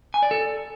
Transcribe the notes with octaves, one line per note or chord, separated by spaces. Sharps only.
G#5
D5
A4